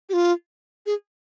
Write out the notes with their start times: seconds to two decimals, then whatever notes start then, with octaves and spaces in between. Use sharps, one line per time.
0.09 G4
0.13 F4
0.86 G#4